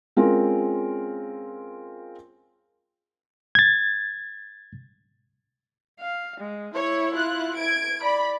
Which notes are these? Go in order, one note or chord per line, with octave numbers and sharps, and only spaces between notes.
G#3 C4 C#4 F4 A#4
G#6 A6
F5
G#3
E4 C#5
F4 F#6
G#6 D7
D5 B5